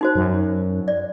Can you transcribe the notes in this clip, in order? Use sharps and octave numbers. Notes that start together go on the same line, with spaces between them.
D#4 F#4 C5
F#2
D5